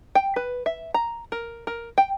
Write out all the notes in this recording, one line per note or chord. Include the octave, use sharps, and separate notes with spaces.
G5
B4
E5
A#5
A#4
A#4
G5